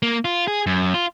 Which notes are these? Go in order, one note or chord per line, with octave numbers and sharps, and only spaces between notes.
A#3
F4
G#4
F#2
F4